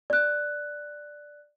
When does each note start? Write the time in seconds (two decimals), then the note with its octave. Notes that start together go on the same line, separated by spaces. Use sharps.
0.10 D5 F#6